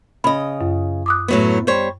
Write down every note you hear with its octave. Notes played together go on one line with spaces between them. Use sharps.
C#3 D#5 B5
F#2
D6 D#6 F#6
A2 F#3 B3
G3 C5 C#5